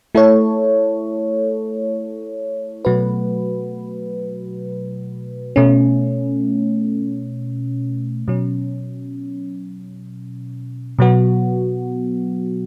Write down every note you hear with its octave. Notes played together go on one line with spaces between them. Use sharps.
A3 E4 A4 C#5
B2 F#3 A3 F#4 B4
B2 A3 C#4
B2 F#3 C#4
B2 F#3 B3 F#4